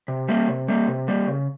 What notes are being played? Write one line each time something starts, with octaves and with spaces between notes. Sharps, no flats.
C3
G3 A#3
C3
G3 A#3
C3
G3 A#3
C#3